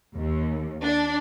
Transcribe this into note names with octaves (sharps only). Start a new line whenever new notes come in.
D#2
D4